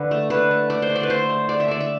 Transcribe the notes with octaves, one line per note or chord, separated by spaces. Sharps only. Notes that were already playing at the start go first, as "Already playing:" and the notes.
Already playing: D3 B4
A3
D3 B4
A3
A3 D5
C5
D3
D5
B4
A3 C5
A3
D3 D5
E5
D3 D5
E5